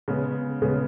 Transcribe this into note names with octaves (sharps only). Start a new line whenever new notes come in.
C#3 G#3 B3
C#3 G#3 B3